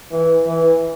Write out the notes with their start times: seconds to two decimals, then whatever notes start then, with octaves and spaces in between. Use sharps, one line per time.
0.11 E3
0.47 E3